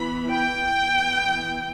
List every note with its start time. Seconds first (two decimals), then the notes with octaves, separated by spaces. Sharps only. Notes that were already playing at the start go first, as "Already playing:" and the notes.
Already playing: E3 B3 B5
0.31 G5
0.84 E3 B3